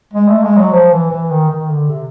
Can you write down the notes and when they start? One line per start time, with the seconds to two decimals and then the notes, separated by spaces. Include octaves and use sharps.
0.13 G#3
0.28 A3
0.43 G#3
0.57 F#3
0.72 F3
0.92 E3
1.11 E3
1.31 D#3
1.50 D#3
1.70 D3
1.89 C3